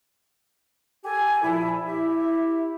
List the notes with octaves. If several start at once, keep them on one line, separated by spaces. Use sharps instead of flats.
G4 A4 G#5
A#2 F3 E4
E4 G4 E5